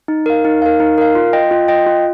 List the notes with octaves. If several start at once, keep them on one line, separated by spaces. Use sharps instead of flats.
D#4
A#4 F5
D#4
A#4 F5
D#4
A#4 F5
F4
D#5 G5
F4
D#5 G5
F4